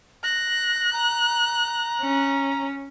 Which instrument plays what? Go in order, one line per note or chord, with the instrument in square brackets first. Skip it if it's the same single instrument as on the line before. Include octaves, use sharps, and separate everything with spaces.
[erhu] F#6 [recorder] A#6
[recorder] A#5
[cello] C#4